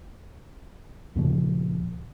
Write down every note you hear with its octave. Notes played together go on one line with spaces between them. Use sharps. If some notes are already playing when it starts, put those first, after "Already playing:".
D2 A#2 C#3 F3